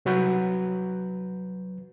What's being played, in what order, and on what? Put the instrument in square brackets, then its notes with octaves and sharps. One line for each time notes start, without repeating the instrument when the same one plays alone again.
[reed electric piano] C2 F#3 F#4 B4 G6